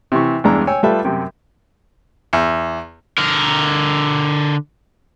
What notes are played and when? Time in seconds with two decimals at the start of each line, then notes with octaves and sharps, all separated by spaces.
0.12 C3 E3 C#6
0.44 E2 G2 G#3 D4 A#5 E6
0.67 C#5 G5 G#5 E6
0.83 G3 A3 F4 A4 B4 E5
1.05 F#2 C3 G5
2.33 E2
3.18 D3 A#4